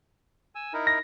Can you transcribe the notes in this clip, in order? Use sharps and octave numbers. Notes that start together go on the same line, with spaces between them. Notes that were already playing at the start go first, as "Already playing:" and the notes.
G#5 E6
D#4 E4 A#4
A#6